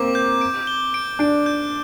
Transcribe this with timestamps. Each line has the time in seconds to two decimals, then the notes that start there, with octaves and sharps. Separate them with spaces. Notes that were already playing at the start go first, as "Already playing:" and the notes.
Already playing: A#3 C4 D6
0.15 G6
0.41 D7
0.67 G7
0.94 D7
1.19 D4 D7
1.46 G6